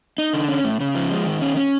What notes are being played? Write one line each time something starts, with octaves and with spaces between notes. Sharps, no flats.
D#4
D3
C#4
A2
C#3
F3
G#3
D#3
C#4
C#4